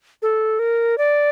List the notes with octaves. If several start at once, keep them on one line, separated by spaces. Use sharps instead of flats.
A4
A#4
D5